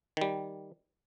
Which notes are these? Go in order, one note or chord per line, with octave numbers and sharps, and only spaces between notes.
D#3 G3